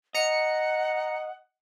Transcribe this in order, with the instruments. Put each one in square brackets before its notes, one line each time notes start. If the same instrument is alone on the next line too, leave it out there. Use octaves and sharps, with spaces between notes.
[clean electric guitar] D#5 [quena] F#5 [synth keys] A#5 C#7